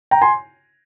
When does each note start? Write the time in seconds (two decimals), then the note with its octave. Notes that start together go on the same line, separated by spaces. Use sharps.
0.11 G5 A#5
0.21 G#5 C6